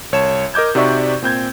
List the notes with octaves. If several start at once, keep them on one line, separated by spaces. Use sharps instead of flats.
C2 C#5 A5 E7
A#4 D#5 D6 G6 G#6
C3 D#4 F#4 D5 E5 C#6
A#2 C4 G6 G#6